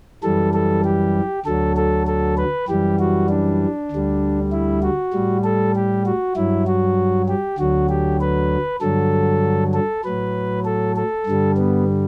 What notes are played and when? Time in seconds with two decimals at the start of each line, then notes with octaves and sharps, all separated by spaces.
0.23 F#2 E3 G3 A4
0.54 A4
0.84 G4
1.46 D2 D3 F#3 A4
1.77 A4
2.07 A4
2.37 B4
2.68 F#2 E3 G3 G4
2.99 F#4
3.29 D4
3.91 D2 D3 G3
4.52 E4
4.83 F#4
5.13 A2 G3
5.44 A4
5.75 G4
6.06 F#4
6.36 G2 F#3 E4
6.67 F#4
7.28 G4
7.58 D2 D3 F#3 F#4
7.89 G4
8.21 B4
8.81 G2 D3 F#3 A4
9.74 A4
10.04 A2 F#3 B4
10.65 A4
10.96 A4
11.26 G2 D3 G3
11.57 B3